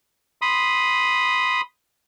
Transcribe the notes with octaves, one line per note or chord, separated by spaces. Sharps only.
B5 C6 D#6